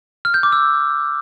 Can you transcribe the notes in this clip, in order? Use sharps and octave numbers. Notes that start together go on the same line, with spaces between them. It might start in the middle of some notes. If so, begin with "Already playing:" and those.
F6
G6
D6
E6